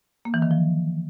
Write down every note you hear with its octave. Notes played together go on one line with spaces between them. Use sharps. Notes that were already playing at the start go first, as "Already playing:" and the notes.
A#3
E3
D#3
F3